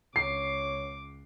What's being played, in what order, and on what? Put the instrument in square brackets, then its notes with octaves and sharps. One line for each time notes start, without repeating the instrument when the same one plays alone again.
[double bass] C#2 [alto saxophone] C#5 [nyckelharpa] D6 [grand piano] C7